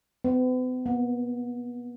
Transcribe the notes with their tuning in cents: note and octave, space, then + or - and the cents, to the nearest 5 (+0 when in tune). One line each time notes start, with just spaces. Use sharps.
B3 +45
B3 -30